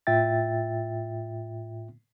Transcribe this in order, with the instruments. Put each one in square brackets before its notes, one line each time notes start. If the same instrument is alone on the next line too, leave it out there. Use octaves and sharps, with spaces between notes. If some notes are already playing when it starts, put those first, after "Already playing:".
[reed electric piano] A2 F4 E5 G5 A6